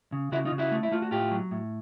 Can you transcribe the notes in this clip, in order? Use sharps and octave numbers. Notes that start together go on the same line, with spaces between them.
C#3
C#3 E4 F#4
D#4 F4
C#3
E4 F#4
A3
E4
A3 F4
F#4
A2 F4 G4
F#3
A2